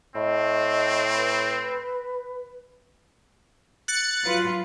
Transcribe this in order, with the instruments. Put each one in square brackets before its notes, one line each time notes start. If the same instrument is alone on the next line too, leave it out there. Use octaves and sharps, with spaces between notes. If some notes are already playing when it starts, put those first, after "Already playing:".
[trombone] A2 [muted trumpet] C4 [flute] D#5
[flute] B4
[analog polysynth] F#6 A6 C#7
[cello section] F#3 F4 B4